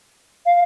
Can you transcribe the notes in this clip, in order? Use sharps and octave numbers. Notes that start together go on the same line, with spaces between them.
F5